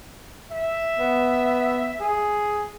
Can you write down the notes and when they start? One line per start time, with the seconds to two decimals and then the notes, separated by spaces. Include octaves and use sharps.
0.51 E5
0.99 B3
2.00 G#4